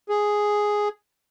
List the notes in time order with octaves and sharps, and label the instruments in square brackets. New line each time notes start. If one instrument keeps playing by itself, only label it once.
[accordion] G#4